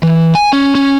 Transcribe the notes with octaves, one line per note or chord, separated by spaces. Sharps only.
E3
G#5
C#4
C#4